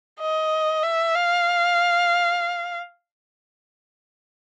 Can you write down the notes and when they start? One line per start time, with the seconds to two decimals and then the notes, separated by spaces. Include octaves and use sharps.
0.20 D#5
0.83 E5
1.15 F5